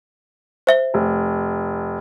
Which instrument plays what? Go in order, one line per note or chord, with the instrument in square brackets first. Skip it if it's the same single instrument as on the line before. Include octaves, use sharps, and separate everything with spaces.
[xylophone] C5 E5 G7
[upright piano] F1